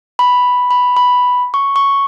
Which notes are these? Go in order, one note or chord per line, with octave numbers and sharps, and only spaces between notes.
B5
B5
B5
C#6
C#6